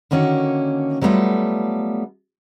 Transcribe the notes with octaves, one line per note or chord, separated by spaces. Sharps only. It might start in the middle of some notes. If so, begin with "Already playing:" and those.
D3 D#3 A#3 C#4 F#4
F#3 G3 A3 B3 F4 A4